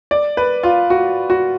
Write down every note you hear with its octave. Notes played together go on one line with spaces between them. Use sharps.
D5
B4
F4
F#4
F#4